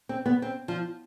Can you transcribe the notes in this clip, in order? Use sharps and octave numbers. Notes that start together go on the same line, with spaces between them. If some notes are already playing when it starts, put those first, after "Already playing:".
C4
B3
C4
F3